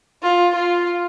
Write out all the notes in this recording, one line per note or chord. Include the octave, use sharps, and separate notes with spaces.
F4
F4